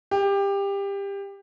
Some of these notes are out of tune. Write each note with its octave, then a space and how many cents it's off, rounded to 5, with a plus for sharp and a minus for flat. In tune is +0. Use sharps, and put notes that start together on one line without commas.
G4 +20